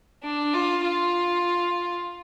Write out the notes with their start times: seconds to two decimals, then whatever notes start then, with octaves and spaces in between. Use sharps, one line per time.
0.24 D4
0.54 F4
0.84 F4